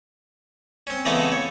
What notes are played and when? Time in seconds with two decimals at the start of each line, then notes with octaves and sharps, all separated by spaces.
0.87 C4 C#4
1.05 C#3 E3 G#3 A3 B3 C4
1.32 C#5